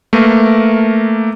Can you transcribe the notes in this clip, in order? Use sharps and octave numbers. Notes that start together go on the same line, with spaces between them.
A3 A#3 A#4 B4